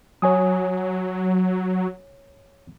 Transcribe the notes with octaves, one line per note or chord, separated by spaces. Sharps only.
F#3 C#5 G#5 D#6